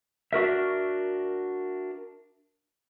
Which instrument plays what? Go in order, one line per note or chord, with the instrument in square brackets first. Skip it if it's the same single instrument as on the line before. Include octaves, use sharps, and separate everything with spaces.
[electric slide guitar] D4 F#4 A#4 E5